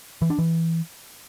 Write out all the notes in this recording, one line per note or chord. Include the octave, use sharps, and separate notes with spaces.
E3
D4
E3